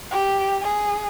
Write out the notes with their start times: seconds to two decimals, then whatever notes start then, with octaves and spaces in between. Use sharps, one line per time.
0.11 G4
0.62 G#4